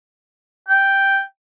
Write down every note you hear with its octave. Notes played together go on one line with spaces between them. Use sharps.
G5